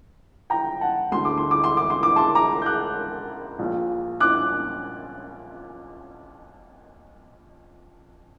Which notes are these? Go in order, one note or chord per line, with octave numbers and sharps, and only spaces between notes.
G5 A#5
F#5 A5
D2 D3 C6
D6
C6
D6
C6
D6
C6
D6
A5 C6
A#5 D6
G6
D6 F#6
A#1 A#2
D6 F#6